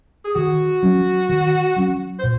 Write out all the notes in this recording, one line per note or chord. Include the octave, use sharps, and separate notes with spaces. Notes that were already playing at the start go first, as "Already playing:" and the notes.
G#4
D#3 F#4
F#3 C#4
D#3
F#3 C#4
C5
A#2